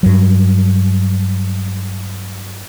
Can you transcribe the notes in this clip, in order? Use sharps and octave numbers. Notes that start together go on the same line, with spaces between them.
G2 F#3